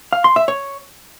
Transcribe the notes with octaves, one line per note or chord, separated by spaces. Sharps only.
F5
C6
E5
C#5